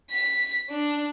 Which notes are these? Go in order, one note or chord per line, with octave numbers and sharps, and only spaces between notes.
B6
D4